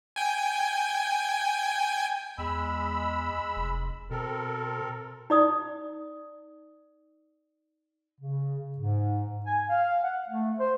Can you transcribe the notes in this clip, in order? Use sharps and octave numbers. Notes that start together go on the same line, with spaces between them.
G5 G#5
E2 G#3 B5 E6
F1
B2 C4 A4 A#4
D#4 D5 D#6
C#3
G#2
G#5
F5
F#5
A3
C5